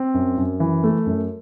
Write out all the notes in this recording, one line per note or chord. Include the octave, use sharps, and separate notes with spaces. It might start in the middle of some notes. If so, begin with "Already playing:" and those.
Already playing: C4
F#2
F#2
E3
A3
F#2